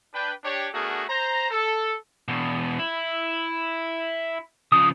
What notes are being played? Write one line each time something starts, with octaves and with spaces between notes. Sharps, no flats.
D4 B4 G5
D4 G4 C#5
A3 B3 D4 F#4 G#4 A#4
C5 A#5
A4
E2 B2
E4
C#3 F3 D#6